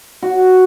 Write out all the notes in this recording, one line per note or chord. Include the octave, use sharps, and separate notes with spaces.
F#4